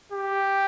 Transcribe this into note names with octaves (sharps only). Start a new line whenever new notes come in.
G4